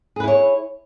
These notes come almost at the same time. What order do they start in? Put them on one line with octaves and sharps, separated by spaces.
G#4 B4 E4 C#5